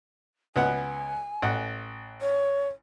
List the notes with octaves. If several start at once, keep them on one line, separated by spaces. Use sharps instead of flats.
C#2 B3 F#5 G#5
A1 F#5
C#5